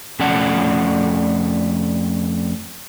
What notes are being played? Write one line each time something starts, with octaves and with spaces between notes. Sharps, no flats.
F2 A3 C#4 D5 F#5 A5